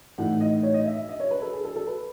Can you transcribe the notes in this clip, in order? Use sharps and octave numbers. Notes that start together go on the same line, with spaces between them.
A2 E3 A3 D#4 F#5
D#5
C#5
D#5
E5
E5
D#5
C#5
B4
A4
G#4
A4
A4
B4